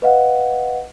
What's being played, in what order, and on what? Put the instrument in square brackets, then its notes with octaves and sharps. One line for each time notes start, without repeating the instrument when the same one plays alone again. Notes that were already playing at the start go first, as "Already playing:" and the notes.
[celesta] B4 D#5 F5 F#5